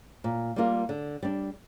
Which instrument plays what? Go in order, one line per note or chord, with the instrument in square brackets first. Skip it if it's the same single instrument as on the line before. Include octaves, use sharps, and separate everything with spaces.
[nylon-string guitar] A#2
G3 A#3 F4 A#4
D3
G3 D4